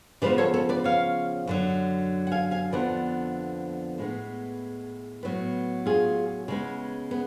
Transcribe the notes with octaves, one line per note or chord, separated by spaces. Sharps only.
C#3 F3 G#3 B3 B4 D5
A4 C#5
A4 C#5
B4 D5
C#5 F5
F#2 D3 F#3
F#5
F5 G#5
F5 G#5
F2 D3 F3 B3 D5 F#5
A2 G#3 B3
A2 F#3 B3
F4 G#4
C#3 G#3 B3
B3